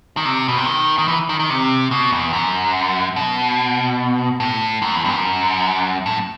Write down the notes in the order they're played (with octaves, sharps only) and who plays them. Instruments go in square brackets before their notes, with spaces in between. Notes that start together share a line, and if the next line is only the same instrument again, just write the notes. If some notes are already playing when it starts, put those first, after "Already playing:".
[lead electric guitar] D#3
C3
B2
C3
D#3
D#3
E3
D#3
D#3
C3
B2
E2
F#2
B2
A2
F#2
E2
G2
F#2
A2